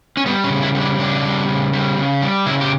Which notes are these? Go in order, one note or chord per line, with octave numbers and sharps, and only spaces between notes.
C#4
G3 B3
C#4
C#3
E4
G3
D4
C#3 D4
G3
C#3
G3
C#3
G3
C#3 E4
G4